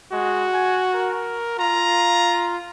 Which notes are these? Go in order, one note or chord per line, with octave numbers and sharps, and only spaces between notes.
G#3 F#4
G#5
A#4
F4 A#5